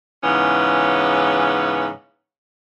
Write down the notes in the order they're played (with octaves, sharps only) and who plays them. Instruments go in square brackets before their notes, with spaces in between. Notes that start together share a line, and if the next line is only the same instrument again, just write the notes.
[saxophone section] G#2 C#3 E3 B3 C#4